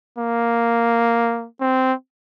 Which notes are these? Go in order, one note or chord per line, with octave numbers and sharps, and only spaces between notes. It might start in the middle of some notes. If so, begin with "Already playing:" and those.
A#3
C4